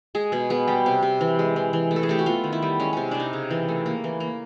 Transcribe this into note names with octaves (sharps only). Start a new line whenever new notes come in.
G#3 G#4
B2 G#4
B3 G#4
G3 G4
C3
C3
E3
G#3
E3
E3
A3
A4
G#4
A3 G4
F#4
B3 F4
D#3
E4
G3
G#3 C#4
C3 C#4
C3 D4
D#4
C#3
E3
A3
A#3
E3
A#3